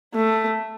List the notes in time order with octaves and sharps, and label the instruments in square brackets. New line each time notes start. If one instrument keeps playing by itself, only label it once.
[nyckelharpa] A3